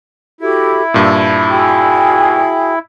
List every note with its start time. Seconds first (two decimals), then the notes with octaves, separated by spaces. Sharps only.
0.41 E4 F#4 G4 A4
0.94 G2 A#2 A5
1.49 F#4 G#4 G5